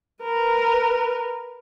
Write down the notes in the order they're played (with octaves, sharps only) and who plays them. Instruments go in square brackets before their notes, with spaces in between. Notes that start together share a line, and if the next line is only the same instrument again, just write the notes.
[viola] A#4 B4